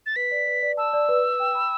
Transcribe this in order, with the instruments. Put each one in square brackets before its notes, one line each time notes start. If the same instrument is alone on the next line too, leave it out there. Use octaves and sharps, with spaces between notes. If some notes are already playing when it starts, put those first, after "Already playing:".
[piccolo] A6
[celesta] B4 [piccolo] B6
[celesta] D5
B4
D5
[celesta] A5 [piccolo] E6
[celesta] D5
B4
B4
G5
B5